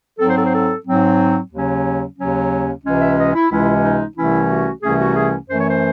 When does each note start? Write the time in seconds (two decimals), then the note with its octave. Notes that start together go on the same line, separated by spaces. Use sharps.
0.19 G#2 F#3 C4 A4
0.28 C5
0.37 A4
0.45 C5
0.55 A4
0.86 G#2 F#3 C4
1.51 D#2 C#3 F#3 C#4
2.18 D#2 C#3 F#3 C#4
2.83 C#2 C3 E3 G#3 C#4
3.01 E5
3.18 D#5
3.34 E4
3.50 C#2 C3 E3 G#3 C#4 E4
3.83 D#4
4.16 C2 C3 E3 A3 C#4 E4
4.49 F#4
4.82 C2 C3 E3 A3 C#4 G#4
5.00 F#4
5.16 G#4
5.48 F#2 E3 A3 C5
5.59 C#5
5.69 C5